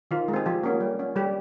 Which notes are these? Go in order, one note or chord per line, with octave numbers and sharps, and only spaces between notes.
D#3 F4
G#3
C4 G#4
F3 G4
A#3 C#4
G3
C#4
G3 G4